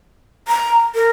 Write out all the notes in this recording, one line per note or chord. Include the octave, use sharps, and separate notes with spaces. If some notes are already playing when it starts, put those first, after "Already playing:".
A#5
A#4